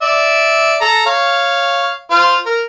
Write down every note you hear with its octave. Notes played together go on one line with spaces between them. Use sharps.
D5 E5
A4 A#5
C#5 F5
F4 C5 F5
A#4